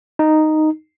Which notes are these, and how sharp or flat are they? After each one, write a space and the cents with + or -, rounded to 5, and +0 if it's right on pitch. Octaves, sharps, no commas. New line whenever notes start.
D#4 -5